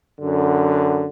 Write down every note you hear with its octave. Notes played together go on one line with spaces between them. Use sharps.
F#2 D3